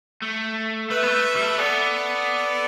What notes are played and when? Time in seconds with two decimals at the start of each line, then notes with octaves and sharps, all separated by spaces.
0.22 A3
0.90 A3 B4 E5
1.03 B3
1.08 A3
1.36 G3
1.41 A3
1.58 B3 A4 D5